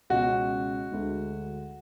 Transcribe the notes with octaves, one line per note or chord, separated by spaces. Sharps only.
C#2 B2 G#3 C#4 F#4
D2 D3 G#3